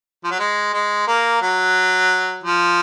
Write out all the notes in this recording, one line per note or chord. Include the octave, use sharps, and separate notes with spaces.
F3
F#3
G#3
G#3
A#3
F#3
F3